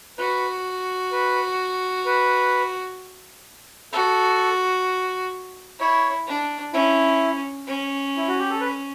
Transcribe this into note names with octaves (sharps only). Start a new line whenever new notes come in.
F#4 B4
B4
B4
F#4 A4
E4 C#5
D4
C#4 E4
C#4
E4
F#4
G4
A4
B4